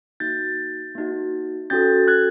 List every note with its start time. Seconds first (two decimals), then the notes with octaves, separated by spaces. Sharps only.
0.20 A#3 D#4 F#4 G6 A6
0.95 A#3 D#4 F#4
1.70 C#4 F#4 A4 G6 A6
2.08 F#6 G#6